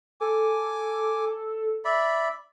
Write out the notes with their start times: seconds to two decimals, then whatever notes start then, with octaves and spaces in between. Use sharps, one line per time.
0.21 A4 G#5 D6
1.85 D5 E5 B5